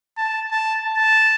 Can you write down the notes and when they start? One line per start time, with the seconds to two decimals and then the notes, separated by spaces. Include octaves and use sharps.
0.17 A5
0.51 A5
0.84 A5